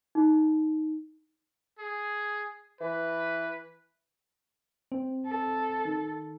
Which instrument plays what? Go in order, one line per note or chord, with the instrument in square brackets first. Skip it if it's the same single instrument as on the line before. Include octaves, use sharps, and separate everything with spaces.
[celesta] D#4
[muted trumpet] G#4
[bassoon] E3 [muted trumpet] B4
[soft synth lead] C4
[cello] A4
[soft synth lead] D#3